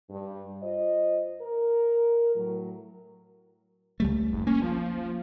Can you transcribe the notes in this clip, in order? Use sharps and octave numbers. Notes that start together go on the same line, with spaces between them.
G2
F4 C5 D#5
A#4
A2 F#3
C#2 G3 A3
F#1
A#3 C#4
F3